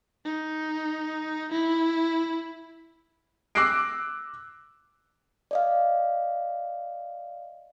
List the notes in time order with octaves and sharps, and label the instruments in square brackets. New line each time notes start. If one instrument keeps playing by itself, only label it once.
[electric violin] D#4
E4
[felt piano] D6 E6 F#6 A#6 C7 D7
[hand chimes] D5 D#5 F5